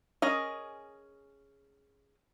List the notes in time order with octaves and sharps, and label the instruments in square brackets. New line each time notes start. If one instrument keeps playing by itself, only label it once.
[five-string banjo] C#4 G#4 A#4 D#5